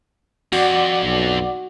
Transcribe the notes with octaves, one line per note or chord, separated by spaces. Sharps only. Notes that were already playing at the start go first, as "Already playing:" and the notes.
F2 F#4 D5 F#5 D6
B1